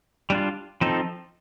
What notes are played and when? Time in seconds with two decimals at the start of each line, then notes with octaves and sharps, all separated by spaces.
0.30 G3 D4 F4
0.81 F3 C4 D#4 A4